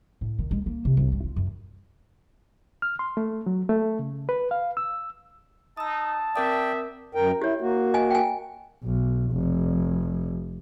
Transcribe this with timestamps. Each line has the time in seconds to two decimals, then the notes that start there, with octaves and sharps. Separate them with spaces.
0.21 A2
0.39 D#3
0.51 G#3
0.66 A#3
0.85 C3
0.97 C2
1.12 G2
1.24 F4
1.36 F#2
2.82 F6
2.99 C6
3.17 A3
3.46 F#3
3.69 A3
3.99 C#3
4.29 B4
4.51 F5
4.77 E6
5.77 D#4 A5 D#6 E6
6.36 C4 A#4 D5 E5 G5 D#6
7.15 F#2 A#4 G5
7.42 E4 G4 C#5
7.61 A#3 F#4
7.94 D#5 G#5
8.10 G5 G#5
8.84 B1
9.32 F1